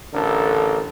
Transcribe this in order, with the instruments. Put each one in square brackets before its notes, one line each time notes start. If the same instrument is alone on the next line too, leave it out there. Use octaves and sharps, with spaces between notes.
[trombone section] A1 D3 A4 A#4